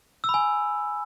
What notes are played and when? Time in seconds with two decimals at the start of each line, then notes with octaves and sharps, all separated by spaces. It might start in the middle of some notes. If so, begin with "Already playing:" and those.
0.24 E6
0.29 B5
0.34 G#5